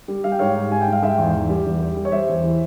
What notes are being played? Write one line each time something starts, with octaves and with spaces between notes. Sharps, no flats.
G3
G3 F5
G5
G#2 C#5 F5
G#2
G3 G#5
G5
G#2
F5
G#2 E5 G5
E2
E2
G3
E2
G3
G3
C#5
G3 C5 E5
E2
E3